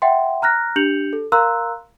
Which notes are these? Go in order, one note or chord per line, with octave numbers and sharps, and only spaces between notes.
E5 F#5 G5 C6
A#5 F6 F#6 A#6
D4 G4 G6 C#7 F7 F#7
A4
A#4 F5 A#5 C6 E6 F#6